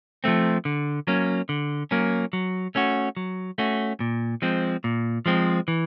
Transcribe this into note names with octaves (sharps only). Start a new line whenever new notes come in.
F3 A3 C4
D3
F#3 A#3 C#4
D3
F#3 A#3 C#4
F#3
A3 C#4 F#4
F#3
A3 C#4 F#4
A#2
F3 G#3 C4
A#2
F3 G#3 C4
E3